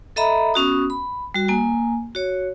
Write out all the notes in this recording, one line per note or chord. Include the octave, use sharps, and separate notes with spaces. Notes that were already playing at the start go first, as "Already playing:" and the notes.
A4 D#5 E5 A#5 B5
B3 C#4 F#4 D#6
B5
G3 F#4
A#3 G#5
F#4 C#5